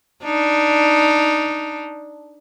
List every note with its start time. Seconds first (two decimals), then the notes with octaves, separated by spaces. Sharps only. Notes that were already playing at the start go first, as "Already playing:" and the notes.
0.24 D4 D#4